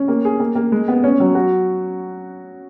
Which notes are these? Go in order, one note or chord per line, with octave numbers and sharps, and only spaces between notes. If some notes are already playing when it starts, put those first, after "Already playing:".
Already playing: C#4
A#3
G#4
A#3
A#3
G#3
B3
C#4
F#3
F#4